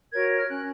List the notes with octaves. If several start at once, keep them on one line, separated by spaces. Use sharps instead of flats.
F#4 A#4 C#5 G#6
F6
C#4 F#6